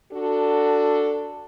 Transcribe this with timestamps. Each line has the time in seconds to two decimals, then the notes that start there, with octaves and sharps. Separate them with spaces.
0.12 D4 F#4 A4